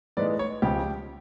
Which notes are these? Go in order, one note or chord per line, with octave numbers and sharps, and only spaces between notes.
A2 E3 G#3 B3 D#4 D5
C#5
C#2 C#3 F3 G4